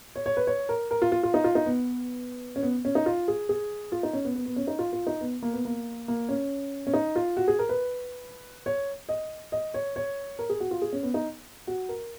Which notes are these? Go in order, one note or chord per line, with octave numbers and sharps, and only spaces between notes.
C#5
C#5
B4
C#5
A#4
A#4
F4
F4
F4
D#4
F4
D#4
B3
C#4
B3
C#4
D#4
F4
G#4
G#4
F4
D#4
C#4
B3
B3
B3
C#4
D#4
F4
F4
D#4
B3
A#3
B3
A#3
A#3
C#4
C#4
D#4
F4
F#4
G#4
A#4
B4
C#5
D#5
D#5
C#5
C#5
A#4
G#4
F#4
F4
G#4
C#4
B3
D#4
F#4
A#4